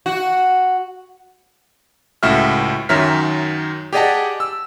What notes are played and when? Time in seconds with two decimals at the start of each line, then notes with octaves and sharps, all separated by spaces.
0.06 F#4
2.23 C#2 A2 F#4 E5 F6
2.89 F#2 D#3 F#3 E5 F6 B6
3.93 G4 G#4 D5 D#5 F#5 A5
4.40 E6